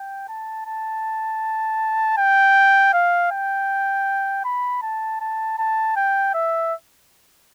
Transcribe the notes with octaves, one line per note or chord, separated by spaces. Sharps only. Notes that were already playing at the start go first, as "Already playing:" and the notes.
Already playing: G5
A5
A5
G5
F5
G5
B5
A5
A5
A5
G5
E5